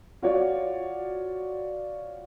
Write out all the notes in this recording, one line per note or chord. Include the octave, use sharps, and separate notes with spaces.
F4 F#4 C#5 D5